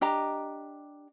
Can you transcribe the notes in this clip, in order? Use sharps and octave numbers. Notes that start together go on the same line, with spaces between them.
D4 G4 D#5 A#5